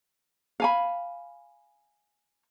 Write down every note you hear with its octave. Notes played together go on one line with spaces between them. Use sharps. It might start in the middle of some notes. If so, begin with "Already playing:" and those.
F5 G#5 B5